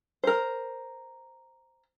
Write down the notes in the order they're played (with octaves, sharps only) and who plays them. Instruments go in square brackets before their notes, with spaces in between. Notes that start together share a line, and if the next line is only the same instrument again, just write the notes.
[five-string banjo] A#4 C5